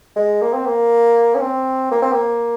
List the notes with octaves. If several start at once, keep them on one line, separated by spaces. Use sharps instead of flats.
G#3
A#3
C4
A#3
C#4
C4
A#3
C4
A#3